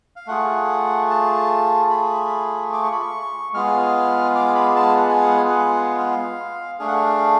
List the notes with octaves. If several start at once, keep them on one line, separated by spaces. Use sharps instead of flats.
F5
A3 F4 G#4 F#5
A5
B5
D6
C#6
B5
C#6
G#3 B3 F4 G#4 F6
D6
B5
A5
F#5
G#5
F#5
G#5
F#5
F5
A3 D4 G#4 F5
F#5
F5